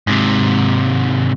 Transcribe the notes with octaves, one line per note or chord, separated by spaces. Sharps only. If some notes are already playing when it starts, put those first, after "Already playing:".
G#2 C3